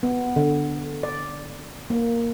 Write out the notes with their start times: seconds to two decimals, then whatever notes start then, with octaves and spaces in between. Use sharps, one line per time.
0.03 B3
0.36 D3
1.03 D5
1.90 A#3